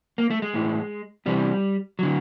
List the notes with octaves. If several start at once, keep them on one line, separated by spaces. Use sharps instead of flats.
A#3
A3
G#3
A2 E3
E2 C3 E3 G3
D3 F#3